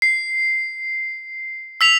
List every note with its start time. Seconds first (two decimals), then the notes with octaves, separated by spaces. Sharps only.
0.02 C7
1.81 E6 B6 F7